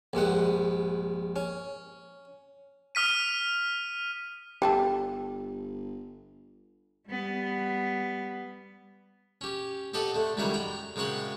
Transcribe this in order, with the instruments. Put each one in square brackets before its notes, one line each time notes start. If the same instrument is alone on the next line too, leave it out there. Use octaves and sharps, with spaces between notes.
[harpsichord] A#1 G2 G#3 F#5
C#4
[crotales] D#6 F6 B6 D#7
[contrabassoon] G1 [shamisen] G3 A3 A4 [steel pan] G4 [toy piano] G5
[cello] G3 B3
[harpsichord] C#4 G4
C4 G4 A4 D#5 F#5
D3 A3
C#2 F#2 D#3 G3 E4 C#5
G5 A#5
F#2 C#3 G#3 C4 C#5 F#5